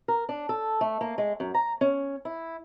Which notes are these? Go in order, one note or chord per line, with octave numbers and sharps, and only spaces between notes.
A#4
D4
A4
A3
A#3
G#3
F#2
A#5
C#4
E4